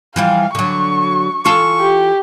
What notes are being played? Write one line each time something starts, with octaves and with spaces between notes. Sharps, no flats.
E3 F3 G3 F5
D3 F#3 C#6
E3 F4 A4 C#6
G4